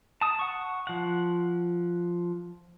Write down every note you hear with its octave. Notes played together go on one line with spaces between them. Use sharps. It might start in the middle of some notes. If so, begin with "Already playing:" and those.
A5 D#6
F#5 C#6
F3 F#5